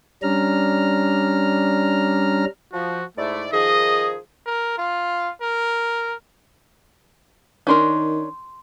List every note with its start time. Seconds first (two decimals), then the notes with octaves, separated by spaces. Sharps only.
0.23 G3 C#4 D4 A#5 F6
2.72 F3 F#4
3.17 G#2 A3 E4 D5
3.52 D#3 F3 G#4 D#5
4.46 A#4
4.78 F4
5.42 A#4
7.67 D#3 C#4 D4 A#4 C6 G6